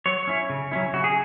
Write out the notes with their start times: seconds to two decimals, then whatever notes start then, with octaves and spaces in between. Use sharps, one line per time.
0.06 F#3 C#5
0.27 C#4 E4
0.50 C#3
0.71 F#3 C#4 E4
0.93 C#3 F#4
1.04 G#4